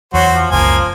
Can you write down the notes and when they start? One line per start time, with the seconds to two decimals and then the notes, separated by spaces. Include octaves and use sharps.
0.14 E2 F#3 F#4 C5
0.34 F3
0.51 F#1 C#2 F3 A#3 G#5